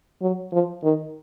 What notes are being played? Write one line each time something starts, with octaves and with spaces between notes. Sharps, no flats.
F#3
F3
D#3